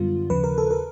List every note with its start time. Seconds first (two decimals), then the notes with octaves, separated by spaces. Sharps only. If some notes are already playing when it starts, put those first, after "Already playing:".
Already playing: F#2 D3 G3 B3 F4
0.30 D#2 C#3 F3 B4
0.44 A#4
0.58 A4
0.71 A#4